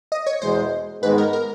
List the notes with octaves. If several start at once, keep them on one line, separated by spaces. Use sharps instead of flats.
D#5
C#5
E2 B2 G#3 C5
G#2 D#3 G#3 B3 B4
A#4
A#4